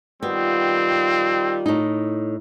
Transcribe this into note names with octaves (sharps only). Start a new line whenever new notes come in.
D#3 G3 B3 C4 F4
A2 D#4